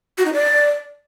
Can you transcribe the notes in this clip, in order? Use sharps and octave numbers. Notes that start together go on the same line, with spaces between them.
F#4
D#4
D5